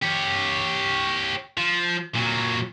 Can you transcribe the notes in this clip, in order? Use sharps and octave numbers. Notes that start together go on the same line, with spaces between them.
G4 C#5
F3
A#2 F#3